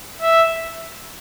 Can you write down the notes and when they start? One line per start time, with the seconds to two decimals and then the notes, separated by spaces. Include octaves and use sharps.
0.22 E5